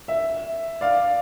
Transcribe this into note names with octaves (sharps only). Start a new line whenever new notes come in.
E5
D5 F5